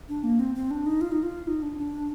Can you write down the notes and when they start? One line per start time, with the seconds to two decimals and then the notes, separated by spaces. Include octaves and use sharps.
0.09 D4
0.24 A#3
0.40 C4
0.55 C4
0.71 D4
0.86 D#4
1.01 F4
1.12 D#4
1.23 F4
1.47 D#4
1.62 D4
1.78 D4